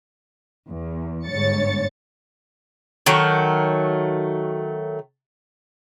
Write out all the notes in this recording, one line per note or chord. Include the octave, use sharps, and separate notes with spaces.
E2
G1 G#2 D3 C#5 A6 C#7
D#3 F#3 A3